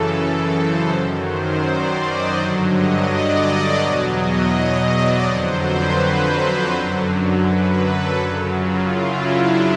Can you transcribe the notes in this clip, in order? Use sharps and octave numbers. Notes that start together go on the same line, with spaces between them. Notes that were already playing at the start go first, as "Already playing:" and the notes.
Already playing: F#2 C#3 E3 A4
C5
F#2 D#3 F#3
C5
D5
D#5
G2 D3 F#3
D#5
D5
D#5
E2 B2 F#3
D#5
D5
F2 D3 F#3 C5
B4
C5
C5
F#2 D3 F#3
B4
A4
F#2 C#3 F#3
F4
E4
D4